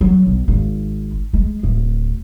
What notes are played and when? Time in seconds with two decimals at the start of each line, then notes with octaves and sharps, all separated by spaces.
0.01 F#3
0.26 B1
0.48 G#1
1.33 G#3
1.63 D1